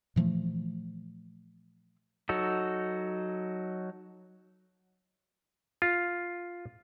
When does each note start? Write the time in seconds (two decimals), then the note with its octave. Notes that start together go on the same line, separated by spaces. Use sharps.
0.16 A#2 E3 F3 A3
2.29 F#3 D#4 F#4 A4
5.82 F4